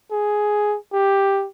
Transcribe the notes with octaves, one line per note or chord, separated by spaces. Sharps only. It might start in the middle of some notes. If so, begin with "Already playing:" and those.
G#4
G4